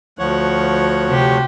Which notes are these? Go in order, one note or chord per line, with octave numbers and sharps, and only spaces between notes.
D2 F3 F#4 C#5 F#5
C3 G4